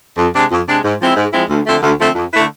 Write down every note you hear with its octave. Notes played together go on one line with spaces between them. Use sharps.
F2
C3 G#3 D4
F2
C3 G#3 D4
G#2
F3 G#3 C4 E4
G#2
F3 G#3 C4 E4
D2
D3 F3 A3 C4
D2
D3 F3 A3 C4
F2
D3 A3 E4 B4